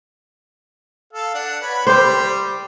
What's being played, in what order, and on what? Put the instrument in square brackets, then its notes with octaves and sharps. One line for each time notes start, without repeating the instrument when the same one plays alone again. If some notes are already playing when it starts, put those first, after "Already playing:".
[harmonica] A4 F5
D4 F#5
B4 C#5
[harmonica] G3 G4 D5 [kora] C5